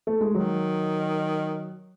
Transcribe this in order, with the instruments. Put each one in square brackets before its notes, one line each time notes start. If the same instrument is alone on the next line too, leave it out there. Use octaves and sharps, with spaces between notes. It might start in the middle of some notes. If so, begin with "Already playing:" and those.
[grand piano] A3
G#3
[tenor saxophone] D#3 [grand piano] F#3